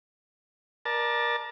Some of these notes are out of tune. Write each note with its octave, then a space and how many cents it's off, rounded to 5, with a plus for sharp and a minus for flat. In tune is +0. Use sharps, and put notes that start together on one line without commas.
A#4 +25 D5 +20 A5 +0